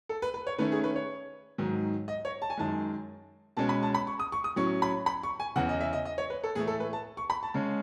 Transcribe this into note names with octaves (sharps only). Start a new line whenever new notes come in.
A4
B4
B4
C#5
D#3 A3 C#4 B4
G#4
B4
C#5
G#2 D#3 F#3
D#5
C#5
A5
G#5
F#2 D#3 G#3 A5
B2 G#3 C#4 A5
B5
A5
B5
C#6
D#6
C#6
D#6
A2 F#3 C#4 C#6
B5
B5
C#6
G#5
E2 C#3 E3 F#5
D#5
E5
D#5
D#5
C#5
B4
A4
A2 E3 A3 G#4
A4
B4
A5
C#6
B5
A5
C#3 G#3 C#4